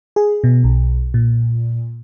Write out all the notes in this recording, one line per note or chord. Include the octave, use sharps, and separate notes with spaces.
G#4
B2
B1
A#2